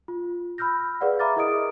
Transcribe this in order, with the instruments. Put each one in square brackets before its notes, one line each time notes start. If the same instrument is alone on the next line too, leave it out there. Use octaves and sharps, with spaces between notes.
[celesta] F4
B5 E6 F6 G6 A#6
G#4 B4 D5 F5 F#5
E5 A#5 B5 D6 F6 A6
E4 G#4 A#4 D#5 D#6 D7